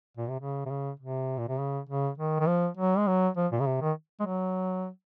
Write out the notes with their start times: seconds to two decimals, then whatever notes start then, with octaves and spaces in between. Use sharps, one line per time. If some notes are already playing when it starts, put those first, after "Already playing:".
0.17 A#2
0.29 C3
0.40 C#3
0.66 C3
0.70 C#3
1.00 C3
1.38 A#2
1.48 C3
1.59 C#3
1.89 C#3
2.18 D#3
2.40 D#3
2.48 F3
2.77 F#3
2.98 G#3
3.08 F#3
3.37 F3
3.52 A#2
3.60 C#3
3.66 C3
3.82 D#3
4.20 G#3
4.26 F#3